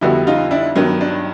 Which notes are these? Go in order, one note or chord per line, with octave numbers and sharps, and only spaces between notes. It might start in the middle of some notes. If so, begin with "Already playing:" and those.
F2 D3 G3 B3 E4 F#4
D#4 F4
D4 E4
G2 D#3 F#3 B3
D4